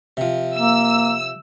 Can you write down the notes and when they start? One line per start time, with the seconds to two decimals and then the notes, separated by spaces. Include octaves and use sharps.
0.17 C3 F3
0.56 A#3 E6